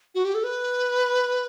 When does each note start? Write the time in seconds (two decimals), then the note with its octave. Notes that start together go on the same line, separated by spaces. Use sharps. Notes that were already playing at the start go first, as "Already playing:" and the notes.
0.15 F#4
0.25 G4
0.34 A4
0.44 B4